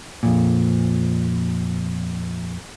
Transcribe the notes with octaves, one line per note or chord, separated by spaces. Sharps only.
F2 A#2